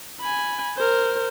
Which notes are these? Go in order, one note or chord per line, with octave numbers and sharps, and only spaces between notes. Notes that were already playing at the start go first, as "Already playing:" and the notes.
G#5 B5
A#4 C5